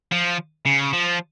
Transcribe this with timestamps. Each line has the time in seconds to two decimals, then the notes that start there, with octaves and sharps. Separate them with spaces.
0.12 F3
0.66 C#3
0.93 F3